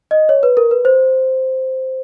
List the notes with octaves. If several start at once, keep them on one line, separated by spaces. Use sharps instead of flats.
D#5
C#5
B4
A#4
B4
C5